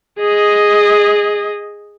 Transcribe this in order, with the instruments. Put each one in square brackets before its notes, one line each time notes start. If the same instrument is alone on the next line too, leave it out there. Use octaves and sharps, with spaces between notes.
[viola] G#4 D#5